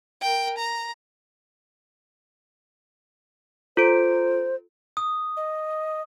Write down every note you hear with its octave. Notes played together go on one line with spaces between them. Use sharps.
A#4 G5
A#5
F4 A4 C5 D7
D#6
D#5